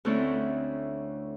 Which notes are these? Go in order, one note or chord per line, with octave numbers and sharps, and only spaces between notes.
D2 D3 A3 C4 C#4 E4